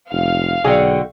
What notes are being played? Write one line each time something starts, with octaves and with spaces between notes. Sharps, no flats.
F1 F5
B1 D3 F#4 G#4 G5